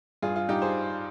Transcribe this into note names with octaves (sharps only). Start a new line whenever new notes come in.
G2 F4 G#4
F4
G2 D#4 G4
G#4 C5